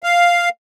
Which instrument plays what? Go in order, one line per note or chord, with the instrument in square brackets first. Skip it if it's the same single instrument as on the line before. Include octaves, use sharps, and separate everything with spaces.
[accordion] F5